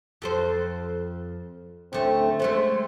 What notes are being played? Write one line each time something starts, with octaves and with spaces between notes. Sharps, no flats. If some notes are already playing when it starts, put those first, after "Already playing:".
F2 A4 C5
D2 A3 C4 C#4
G#3 A3 B3 C5